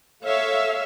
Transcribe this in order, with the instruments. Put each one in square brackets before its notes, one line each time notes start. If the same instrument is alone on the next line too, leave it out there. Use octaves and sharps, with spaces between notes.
[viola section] A4 C#5 E5 F5